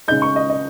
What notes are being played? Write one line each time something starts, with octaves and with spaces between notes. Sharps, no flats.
C#3 G#3 D#4 G6
C#6
D#5
D#5